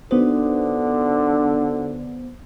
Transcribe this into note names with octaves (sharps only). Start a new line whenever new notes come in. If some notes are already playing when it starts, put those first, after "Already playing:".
D3 B3 D4 D#4 F#4 C5